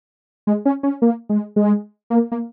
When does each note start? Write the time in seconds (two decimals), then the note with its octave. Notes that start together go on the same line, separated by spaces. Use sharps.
0.47 G#3
0.65 C#4
0.83 C#4
1.02 A#3
1.29 G#3
1.56 G#3
2.10 A#3
2.32 A#3